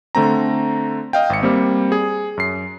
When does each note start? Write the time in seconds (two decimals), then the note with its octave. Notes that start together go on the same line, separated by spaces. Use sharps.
0.15 D3 A3 C4 A#5
1.13 D#5 F5 G5
1.30 G#1 C#7
1.43 G3 A#3 C4
1.92 G#4
2.37 F#2 C7